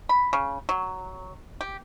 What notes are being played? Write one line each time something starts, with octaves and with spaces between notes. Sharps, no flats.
B5
C#3
F#3
G4